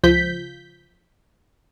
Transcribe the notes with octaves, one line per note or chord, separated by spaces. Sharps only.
C#2 F3 G6 B6